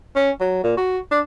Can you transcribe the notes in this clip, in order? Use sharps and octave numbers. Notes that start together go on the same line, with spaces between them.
C#4
F#3
A#2
F#4
D4